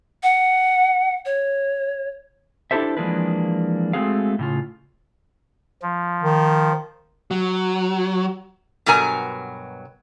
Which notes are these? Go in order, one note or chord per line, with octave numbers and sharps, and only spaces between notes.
F#5
C#5
D4 E4 G4 A4 C5 E5
E3 F3 G#3 A#3 D4 B4
G#3 A3 C4 F#4 G#4 F5
A2 C#3 F4
F3
D#3
F#3
G2 B2 F#3 A#4 G#5